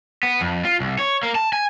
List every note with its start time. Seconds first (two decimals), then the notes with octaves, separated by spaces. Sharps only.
0.23 B3
0.41 F2
0.65 F4
0.80 C2
0.99 C#5
1.23 A#3
1.35 A5
1.53 G#5